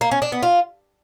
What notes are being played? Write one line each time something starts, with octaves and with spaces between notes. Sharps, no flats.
A#3
C#4
D4
B3
F4